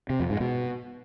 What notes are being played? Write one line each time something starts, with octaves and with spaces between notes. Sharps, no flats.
C3
F2
G#2
B2